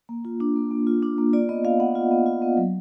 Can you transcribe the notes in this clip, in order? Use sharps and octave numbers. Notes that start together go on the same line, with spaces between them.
A#3
F4
D4
A#3
A#3
F4
D4
A#3
F4 D5
B3 D#5
F4 F5
B3 F#5
F4
B3
F4
B3
F#3